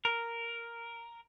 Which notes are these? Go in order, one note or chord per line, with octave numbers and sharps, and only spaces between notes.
A#4